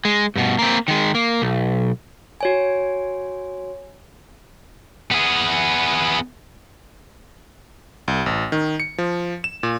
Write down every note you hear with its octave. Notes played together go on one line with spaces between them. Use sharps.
G#3
G2 B2
A#3 C4
D#3 G#3
A#3
B1
F#4 C#5 G#5
B3 G#4
C2
A1
D#3
C#7
F3
E7
A#2